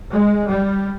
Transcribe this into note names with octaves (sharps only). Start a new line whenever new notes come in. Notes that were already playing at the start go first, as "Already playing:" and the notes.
G#3
G3